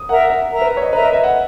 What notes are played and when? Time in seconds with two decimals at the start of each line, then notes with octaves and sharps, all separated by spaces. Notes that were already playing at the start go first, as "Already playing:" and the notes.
Already playing: D#6
0.09 A#4 E5 F#5 A#5
0.30 E5
0.51 A#4 E5 A#5
0.62 B4
0.77 C#5
0.82 D#5
0.93 A#4 B4 E5 A#5
1.03 D#5
1.13 E5
1.24 F#5